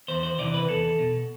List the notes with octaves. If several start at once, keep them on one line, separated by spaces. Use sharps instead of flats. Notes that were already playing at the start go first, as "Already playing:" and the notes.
E2 C5
C5
C3 E3 D5
B4
E2 A4
B2